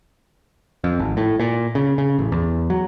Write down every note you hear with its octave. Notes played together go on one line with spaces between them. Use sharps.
F2
G#1
A2
A#2
C#3
C#3
A1
E2
F#3